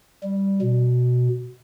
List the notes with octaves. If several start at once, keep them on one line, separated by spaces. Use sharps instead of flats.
G3
B2